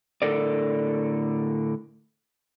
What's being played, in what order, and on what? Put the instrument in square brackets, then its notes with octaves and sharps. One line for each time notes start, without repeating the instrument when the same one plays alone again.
[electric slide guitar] A2 D3 A4 A#4 D5